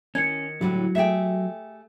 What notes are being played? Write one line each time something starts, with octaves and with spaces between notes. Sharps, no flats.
D#3 C#4 G#6 C#7
A2 D3 F#3 G3
A3 G4 G#4 E5 G5